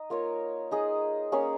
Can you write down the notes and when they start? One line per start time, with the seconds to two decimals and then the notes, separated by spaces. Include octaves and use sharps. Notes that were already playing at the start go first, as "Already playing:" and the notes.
Already playing: D#4 D#5
0.10 A#3 F4 A#4 C#5
0.71 D#4 G#4 D#5
1.32 A#3 C#4 G#4 C#5